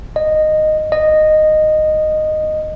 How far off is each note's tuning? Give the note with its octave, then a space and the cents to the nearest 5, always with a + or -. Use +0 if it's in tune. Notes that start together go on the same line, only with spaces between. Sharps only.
D#5 -10
D#5 -10